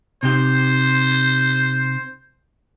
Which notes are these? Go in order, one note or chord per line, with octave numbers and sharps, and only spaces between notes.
C3 D#4 G4 C5